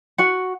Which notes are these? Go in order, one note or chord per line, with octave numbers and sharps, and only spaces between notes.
F#4 F#5